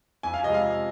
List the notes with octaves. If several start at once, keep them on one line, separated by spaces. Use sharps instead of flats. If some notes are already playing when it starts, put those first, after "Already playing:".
F2 G#5
F5
C3 F3 G#3 D#5
F5
F2